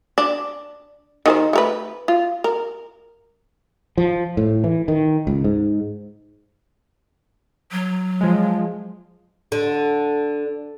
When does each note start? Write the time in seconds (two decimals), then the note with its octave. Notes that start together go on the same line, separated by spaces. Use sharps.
0.18 D4
1.26 D#3 G#4 C5
1.53 A3 A#4 B4
2.08 F4
2.44 A#4
3.98 F3
4.37 A2
4.64 E3
4.88 D#3
5.27 C#2
5.44 G#2
7.72 F#3
8.21 F3 G#3
9.52 D3